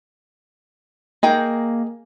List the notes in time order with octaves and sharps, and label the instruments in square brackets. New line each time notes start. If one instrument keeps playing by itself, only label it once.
[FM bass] A#3 [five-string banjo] D#4 G#4 G5